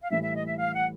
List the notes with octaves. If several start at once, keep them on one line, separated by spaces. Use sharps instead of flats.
F5
A2 E3 G3 E5
E5
D#5
E5
F5
F#5